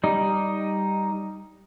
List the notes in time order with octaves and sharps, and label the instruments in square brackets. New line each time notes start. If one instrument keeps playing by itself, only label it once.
[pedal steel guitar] G3 D#4